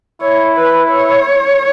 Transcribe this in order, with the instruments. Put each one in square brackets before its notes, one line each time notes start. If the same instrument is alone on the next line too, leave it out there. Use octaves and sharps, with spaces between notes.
[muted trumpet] E4 [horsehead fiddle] C#5
[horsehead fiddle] B4
C#5